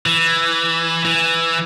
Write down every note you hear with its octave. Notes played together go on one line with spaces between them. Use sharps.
E3
E3